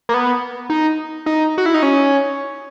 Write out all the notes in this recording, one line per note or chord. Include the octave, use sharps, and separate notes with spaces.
A#3
B3
D#4
D#4
F#4
E4
D#4
C#4